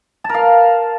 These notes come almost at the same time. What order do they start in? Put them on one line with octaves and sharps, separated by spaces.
A5 A#4 F5